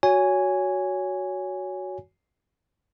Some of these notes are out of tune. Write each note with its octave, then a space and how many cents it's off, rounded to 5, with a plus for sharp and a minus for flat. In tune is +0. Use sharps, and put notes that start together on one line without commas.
F#4 +0 C#5 +20 G#5 -5